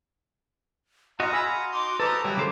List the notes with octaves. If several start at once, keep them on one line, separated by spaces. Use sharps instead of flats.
F#4 D#5 F5 A#5 C6 A#6
G#5 B5 E6
D#4 C6 D6
C4 G4 A4 B4 D#5 A#5
E3 F#3 G3 A#3 E4
C#3 A4 C5 D6